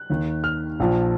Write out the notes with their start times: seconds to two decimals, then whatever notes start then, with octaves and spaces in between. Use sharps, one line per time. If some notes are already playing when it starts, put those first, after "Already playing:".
Already playing: F#6
0.10 D#2 D#3
0.44 F6
0.80 A#1 A#2 F3